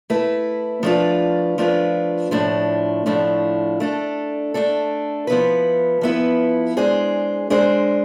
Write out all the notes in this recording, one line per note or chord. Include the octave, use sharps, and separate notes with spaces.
A3 E4 B4
F3 A3 D4 F4 B4
F3 A3 D4 F4 B4
A2 F3 A3 D4
A2 F3 A3 D4
A3 D4 A4
A3 D4 A4
F3 B3 E4 B4
F3 B3 E4 B4
G#3 D4 G#4 C5
G#3 D4 G#4 C5